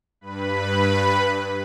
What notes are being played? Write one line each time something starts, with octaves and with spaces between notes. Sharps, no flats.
G2 B4 B5